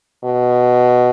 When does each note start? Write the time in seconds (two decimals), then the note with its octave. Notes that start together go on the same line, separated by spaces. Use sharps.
0.24 B2